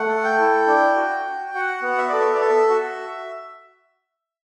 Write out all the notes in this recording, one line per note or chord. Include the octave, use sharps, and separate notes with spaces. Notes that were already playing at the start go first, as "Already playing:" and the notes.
Already playing: A3 F#5
A4
G5
E4
D4
F#4
F#4
F#4 F#5
B3
E5
A4 D5
E5
D5
A4 E5
F#4